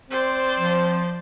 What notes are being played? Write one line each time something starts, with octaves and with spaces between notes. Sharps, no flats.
C4 C5 D5
F3